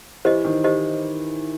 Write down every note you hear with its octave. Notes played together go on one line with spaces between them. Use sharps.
E3 G4 C5 D#5
D#3
G4 C5 D#5